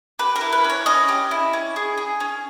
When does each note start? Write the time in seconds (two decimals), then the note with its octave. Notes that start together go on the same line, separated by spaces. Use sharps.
0.19 G4 B4
0.36 A#4
0.41 E4
0.53 B4
0.64 C#4
0.70 C#5
0.86 C#4 D#5
1.08 G4
1.31 E4
1.53 C#4
1.76 G#4
1.98 G#4
2.20 C#4